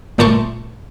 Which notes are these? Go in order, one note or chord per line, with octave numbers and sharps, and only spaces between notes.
G1 A#2 A3 A5 C6 C#6